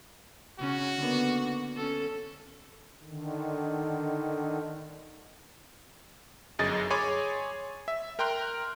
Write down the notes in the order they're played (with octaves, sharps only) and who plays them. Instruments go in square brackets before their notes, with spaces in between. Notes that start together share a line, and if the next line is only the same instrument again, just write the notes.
[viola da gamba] C#3 C#4 [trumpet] F#4
[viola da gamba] D3 A#3 B3
C#4 A4
[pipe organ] D3 D#3
[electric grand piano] G1 F#2 G#4 D#5 A6
G#4 C#5 G#5 B5 C6 D6
E5
A#4 G5 A#5 C6 F6 F#6